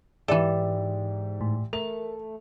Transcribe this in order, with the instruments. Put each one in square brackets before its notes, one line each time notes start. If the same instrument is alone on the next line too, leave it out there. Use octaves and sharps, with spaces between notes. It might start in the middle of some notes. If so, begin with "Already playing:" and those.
[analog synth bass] G#2 [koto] E3 A4 [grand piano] G4 D5 E5
[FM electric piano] A2
[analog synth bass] A3 [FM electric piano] A#4 [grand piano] F7